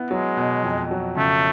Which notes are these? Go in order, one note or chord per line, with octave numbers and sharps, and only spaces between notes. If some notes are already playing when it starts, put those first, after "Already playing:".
Already playing: B3 E4
F#3 G#3
B2
F2
F#3
C#3 A3